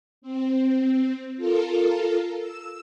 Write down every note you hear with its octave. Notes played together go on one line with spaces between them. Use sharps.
C4
F4 A4 A#4
E6